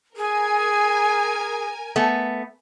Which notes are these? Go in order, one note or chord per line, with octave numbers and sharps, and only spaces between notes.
G#4 A#4 G#5
A3 B3